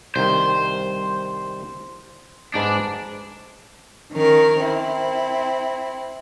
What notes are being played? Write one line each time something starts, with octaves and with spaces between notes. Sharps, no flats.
C2 D#3 C5
G#2 D4 D#4 B4
D#3 C#4 A#4
C4 E4